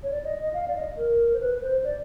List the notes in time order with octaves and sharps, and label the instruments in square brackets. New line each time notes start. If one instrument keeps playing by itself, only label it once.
[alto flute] C#5
D5
D#5
D#5
F5
D5
D#5
A#4
C5
B4
C5
D5